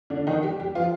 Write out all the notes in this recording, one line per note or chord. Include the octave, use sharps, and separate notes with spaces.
D3 D4
D#3 D#4
G3 G4
G3 G4
F3 F4